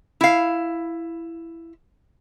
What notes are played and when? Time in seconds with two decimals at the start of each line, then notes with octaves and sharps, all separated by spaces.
0.21 E4 F5